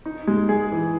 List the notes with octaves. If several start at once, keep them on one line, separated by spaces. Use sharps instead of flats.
D#4
G#3
G#4
E3